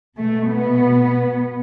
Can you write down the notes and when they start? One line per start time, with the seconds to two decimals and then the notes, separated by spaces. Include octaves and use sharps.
0.17 B2 A3
0.49 B3